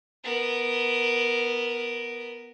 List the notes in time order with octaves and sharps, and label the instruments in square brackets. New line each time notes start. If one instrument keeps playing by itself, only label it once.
[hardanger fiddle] B3 A#4